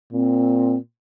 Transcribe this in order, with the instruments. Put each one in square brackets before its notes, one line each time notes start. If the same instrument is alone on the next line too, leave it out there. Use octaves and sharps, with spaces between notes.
[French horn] A#2 [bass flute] C4